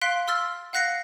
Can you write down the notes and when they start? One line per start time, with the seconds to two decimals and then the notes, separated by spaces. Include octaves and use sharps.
0.01 F5 C6 F#6 B6 D7
0.28 C6 E6 F6 A6
0.73 F5 F#5 F#6 A#6 C7 C#7